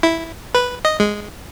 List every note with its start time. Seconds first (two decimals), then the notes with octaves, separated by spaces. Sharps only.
0.03 E4
0.55 B4
0.85 D#5
1.00 G#3